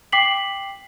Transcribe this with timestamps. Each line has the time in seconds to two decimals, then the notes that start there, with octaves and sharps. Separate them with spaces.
0.12 G5 D6 B6 C7 F#7